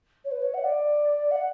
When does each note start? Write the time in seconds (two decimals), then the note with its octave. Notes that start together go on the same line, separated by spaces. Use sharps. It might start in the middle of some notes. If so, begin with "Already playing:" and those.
0.25 C#5
0.31 B4
0.42 C#5
0.54 F#5
0.64 D5
1.31 F#5